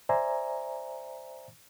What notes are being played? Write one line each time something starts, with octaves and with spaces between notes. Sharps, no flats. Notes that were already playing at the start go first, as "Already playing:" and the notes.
C5 D5 E5 G#5 A#5